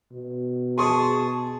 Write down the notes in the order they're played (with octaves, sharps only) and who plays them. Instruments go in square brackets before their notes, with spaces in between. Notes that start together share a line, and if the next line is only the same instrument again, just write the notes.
[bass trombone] B2
[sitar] G#4 [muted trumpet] A5 [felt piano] C6 C#6 D#6